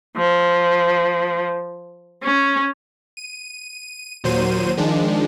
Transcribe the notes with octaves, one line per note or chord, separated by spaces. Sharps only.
F3
C#4
D#7
D#2 A#2 F#3 C5 D#7
D#3 F3 G#3 D4